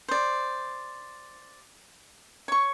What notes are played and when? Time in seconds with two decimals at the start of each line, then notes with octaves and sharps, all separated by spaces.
0.08 C5 D5
2.48 C#5 C#6